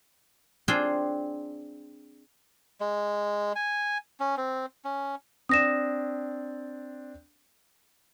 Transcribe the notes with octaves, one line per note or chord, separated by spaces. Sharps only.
C4 D4 F4 G#4 C5 G5
G#3
G#5
C#4
C4
C#4
C4 D4 D#6 A#6 E7